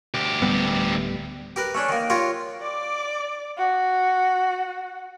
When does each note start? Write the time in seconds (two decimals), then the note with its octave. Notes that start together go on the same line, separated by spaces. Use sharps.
0.14 D2 G4
0.42 D1 G3 B3
1.56 G4 A#4 B4
1.74 A3 C#4 D4
1.89 D#3 A#3
2.10 F4 G4 A#4 C#5
2.61 D5 D6
3.57 F#4